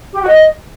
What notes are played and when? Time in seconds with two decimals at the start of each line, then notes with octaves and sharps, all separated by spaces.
0.14 G4
0.21 F#4
0.28 D#5